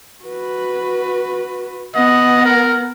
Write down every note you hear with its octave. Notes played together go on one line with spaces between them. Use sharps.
F#4 B4
B3 D#5 F#5
A#4